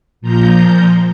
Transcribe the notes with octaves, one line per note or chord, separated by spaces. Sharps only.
A#2 F3 A#5 G6